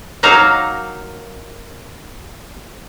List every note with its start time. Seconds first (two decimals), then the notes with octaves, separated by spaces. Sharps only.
0.23 F#3 A#3 D#4 F#4 F5 A#5